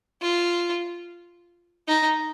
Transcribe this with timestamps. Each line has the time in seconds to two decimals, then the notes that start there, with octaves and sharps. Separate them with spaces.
0.22 F4
1.88 D#4